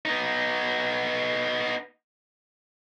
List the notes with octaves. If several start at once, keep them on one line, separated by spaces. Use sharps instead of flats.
B3 D#4